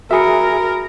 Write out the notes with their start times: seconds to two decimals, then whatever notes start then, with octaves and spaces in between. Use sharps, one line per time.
0.11 F#4 G#4 A#4 E5 B5 C#7